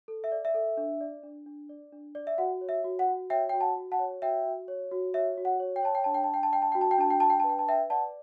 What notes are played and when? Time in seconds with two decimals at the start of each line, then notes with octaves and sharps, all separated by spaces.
0.08 A4
0.24 E5
0.32 D5
0.45 E5
0.54 A4
0.77 D4
1.01 D5
1.23 D4
1.46 D4
1.69 D5
1.92 D4
2.15 D5
2.27 E5
2.38 F#4 F#5
2.61 C#5
2.69 E5
2.84 F#4
2.99 F#5
3.07 F#4
3.30 C#5 E5 G5
3.49 F#4 G5
3.61 F#5 A5
3.76 F#4
3.92 F#5 A5
3.99 C#5
4.22 F#4 E5 G5
4.45 F#4
4.68 C#5
4.91 F#4
5.14 C#5 E5
5.37 F#4
5.45 F#5
5.60 C#5
5.76 G5
5.83 C#5 A5
5.95 G5
6.04 D4 A5
6.14 G5
6.24 A5
6.29 D4 G5
6.43 A5
6.52 D5 G5
6.62 A5
6.72 F#4 G5
6.81 A5
6.91 G5
6.98 D4 A5
7.10 G5
7.20 D4 A5
7.30 G5
7.40 B4 A5
7.49 G5
7.59 A5
7.67 B4 E5 G5
7.90 D5 F#5 A5